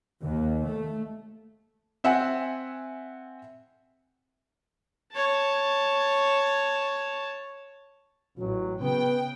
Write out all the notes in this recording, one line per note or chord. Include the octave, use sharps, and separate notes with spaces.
D#2
A3
C4 E5 F#5 G#5
C#5 A5
A1 F#3
C#3 B3 G5